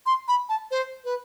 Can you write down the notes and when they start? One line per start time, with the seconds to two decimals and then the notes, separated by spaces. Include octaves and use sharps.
0.06 C6
0.28 B5
0.49 A5
0.71 C5
1.04 B4